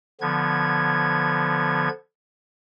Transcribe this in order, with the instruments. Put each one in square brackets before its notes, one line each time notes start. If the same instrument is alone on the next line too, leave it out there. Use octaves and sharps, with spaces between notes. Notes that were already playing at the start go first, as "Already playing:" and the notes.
[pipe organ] D3 F3 B3 G#6